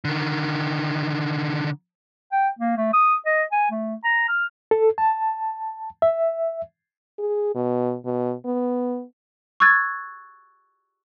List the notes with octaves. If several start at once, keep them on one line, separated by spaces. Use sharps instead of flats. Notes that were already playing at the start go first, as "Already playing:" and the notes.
D3 D#3
G5
A#3
A3
D#6
D#5
G#5
A3
A#5
F6
A4
A5
E5
G#4
B2
B2
B3
C#6 E6 F#6 G#6 A6